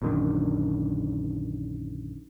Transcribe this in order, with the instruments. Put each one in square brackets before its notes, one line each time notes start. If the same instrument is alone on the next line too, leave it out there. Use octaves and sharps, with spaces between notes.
[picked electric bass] A#1 F#2 D3 D#3